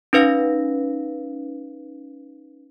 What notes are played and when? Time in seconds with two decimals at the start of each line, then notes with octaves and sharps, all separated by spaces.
0.13 C#4 D#4 B4 F5 A#6